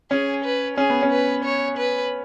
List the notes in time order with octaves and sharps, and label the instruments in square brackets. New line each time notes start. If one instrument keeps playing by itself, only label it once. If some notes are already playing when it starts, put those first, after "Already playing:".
[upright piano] C#4 [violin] G#4
[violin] B4
[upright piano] C#4 [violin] G#4
[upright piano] B3
C#4
[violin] B4
C#5
B4